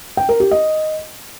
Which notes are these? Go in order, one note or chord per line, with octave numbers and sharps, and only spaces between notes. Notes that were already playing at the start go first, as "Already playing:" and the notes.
G5
A#4
G4
D#5